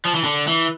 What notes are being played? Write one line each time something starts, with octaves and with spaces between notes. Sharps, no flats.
F3
E3
D3
E3